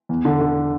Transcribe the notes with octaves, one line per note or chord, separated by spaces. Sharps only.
E2
D3
D3